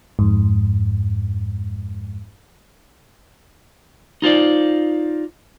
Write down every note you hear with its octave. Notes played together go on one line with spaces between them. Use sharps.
F2 G#2
D#4 F4 C5 D5